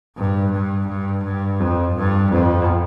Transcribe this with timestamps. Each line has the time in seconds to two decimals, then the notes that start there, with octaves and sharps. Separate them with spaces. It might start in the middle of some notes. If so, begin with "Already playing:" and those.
0.18 G2
0.53 G2
0.89 G2
1.25 G2
1.60 F2
1.96 G2
2.32 F2